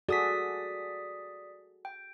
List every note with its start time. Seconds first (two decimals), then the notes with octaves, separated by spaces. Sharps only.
0.09 F#4 G#4 A4 D5 D#6 B6
1.85 G5